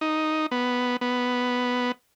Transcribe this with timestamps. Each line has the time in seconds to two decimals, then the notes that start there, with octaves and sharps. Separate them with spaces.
0.01 D#4
0.51 B3
1.01 B3